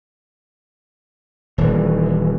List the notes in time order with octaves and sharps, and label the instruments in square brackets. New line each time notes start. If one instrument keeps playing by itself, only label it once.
[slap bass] D#1 E3